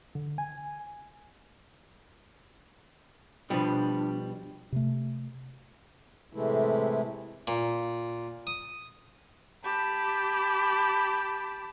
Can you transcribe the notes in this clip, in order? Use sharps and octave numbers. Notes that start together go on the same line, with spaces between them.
D3
G#5
B2 F3 G3 D4
C3 A3
A2 C3 E3 G#3 A3 E4
A#2
D#6
G4 A5 B5